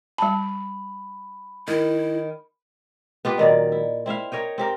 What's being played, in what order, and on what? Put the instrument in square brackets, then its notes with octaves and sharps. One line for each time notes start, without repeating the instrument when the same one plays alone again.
[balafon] G3 A5 [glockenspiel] B5
[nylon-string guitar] D#3 [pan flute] E4
[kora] B3 F4 G4 B4
A#2 D#3 F#3 D5
E4
C4 E4 E5 F5
A#4 C#5 D#5 G5
C4 G4 A#4